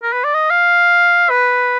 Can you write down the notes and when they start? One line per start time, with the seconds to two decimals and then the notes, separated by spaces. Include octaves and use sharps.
0.03 A#4
0.13 B4
0.24 D5
0.34 D#5
0.50 F5
1.30 B4